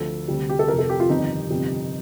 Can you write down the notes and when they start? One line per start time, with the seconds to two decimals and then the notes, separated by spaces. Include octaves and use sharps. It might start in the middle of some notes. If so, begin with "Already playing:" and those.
Already playing: D2 D3 F3 A4
0.28 D2 C3 G3
0.49 G4
0.59 A4
0.68 F1 F2 C3 A#4
0.78 A4
0.90 G4
1.00 F4
1.09 G1 F2 C3 D#3 G3 D#4
1.50 G1 F2 C3 G3